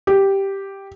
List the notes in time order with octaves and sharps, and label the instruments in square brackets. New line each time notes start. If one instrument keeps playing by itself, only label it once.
[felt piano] G4